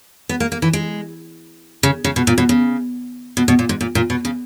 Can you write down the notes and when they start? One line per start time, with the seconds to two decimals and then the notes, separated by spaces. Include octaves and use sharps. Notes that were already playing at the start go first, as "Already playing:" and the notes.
0.29 B3
0.40 A#3
0.52 A#3
0.62 E3
0.73 G#3
1.83 C#3
2.04 C#3
2.16 B2
2.27 A#2
2.38 B2
2.49 C#3
3.37 B2
3.48 B2
3.59 A#2
3.69 G#2
3.81 A#2
3.95 A#2
4.10 B2
4.25 C#3